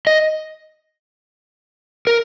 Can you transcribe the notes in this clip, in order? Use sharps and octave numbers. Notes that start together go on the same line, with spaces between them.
D#5
A#4